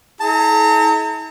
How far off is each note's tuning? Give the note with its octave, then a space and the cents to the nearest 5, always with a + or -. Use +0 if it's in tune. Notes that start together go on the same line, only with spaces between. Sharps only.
E4 -45 A4 -45 A#5 -35